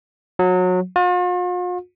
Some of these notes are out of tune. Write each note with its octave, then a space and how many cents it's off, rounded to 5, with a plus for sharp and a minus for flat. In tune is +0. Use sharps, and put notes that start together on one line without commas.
F#3 -25
F4 +45